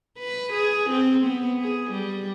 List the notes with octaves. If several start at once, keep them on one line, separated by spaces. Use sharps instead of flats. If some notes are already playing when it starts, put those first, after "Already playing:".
B4
G#4
C4
B3
G#4
G3